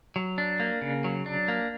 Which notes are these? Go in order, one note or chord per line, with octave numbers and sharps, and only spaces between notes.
F#3
D4
A#3
C#3
F#3
D4
A#3